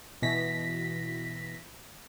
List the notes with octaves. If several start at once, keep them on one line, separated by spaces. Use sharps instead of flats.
B2 E3 A#6 B6